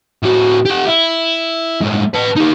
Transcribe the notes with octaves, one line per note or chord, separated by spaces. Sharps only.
A2 F#4
G4 F#5
E4
A2 G#3
B4 A5
D#4 G4